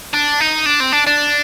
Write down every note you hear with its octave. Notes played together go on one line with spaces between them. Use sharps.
D4
D#4
D4
C4
D4
D4